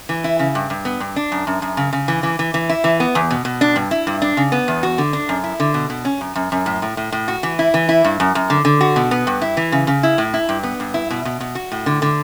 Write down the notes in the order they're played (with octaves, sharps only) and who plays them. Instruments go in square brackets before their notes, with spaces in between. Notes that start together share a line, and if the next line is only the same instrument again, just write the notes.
[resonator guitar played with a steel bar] E3
E4
C#3
G2
G2
B3
G2
D4
F#2
F#2
F#2
C#3
C#3
E3
E3
E3
E3
E4
E3
B3
E2
B2
B2
D4
G2
E4
G2
D4
C#3
B3
E2
F#4
D3
D4
F#2
E4
D3
B2
B2
C#4
F#2
F#2
F#2
A2
A2
A2
A2
F#4
E3
E4
E3
E4
G2
F#2
F#2
D3
D3
F#4
B2
B3
G2
E4
E3
C#3
C#3
E4
A2
E4
G2
B3
G2
E4
B2
B2
B2
F#4
A2
D3
D3